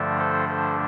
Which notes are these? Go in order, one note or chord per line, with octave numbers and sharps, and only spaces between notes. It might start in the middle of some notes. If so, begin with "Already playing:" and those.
Already playing: G2 D3 F3 A3 D4
A4 C5
A4 C5